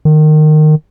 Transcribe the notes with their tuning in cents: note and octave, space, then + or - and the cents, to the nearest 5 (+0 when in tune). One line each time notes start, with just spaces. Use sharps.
D#3 -20